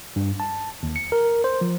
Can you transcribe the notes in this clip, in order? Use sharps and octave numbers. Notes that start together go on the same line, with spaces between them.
G2
A5
D#2
C#7
A#4
C5
F3